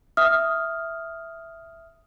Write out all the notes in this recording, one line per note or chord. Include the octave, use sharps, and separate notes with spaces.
E5 D#6 F6